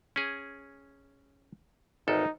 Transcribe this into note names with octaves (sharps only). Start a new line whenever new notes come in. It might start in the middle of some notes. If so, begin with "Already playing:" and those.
C#4 G#4
G#1 E2 D#4 A4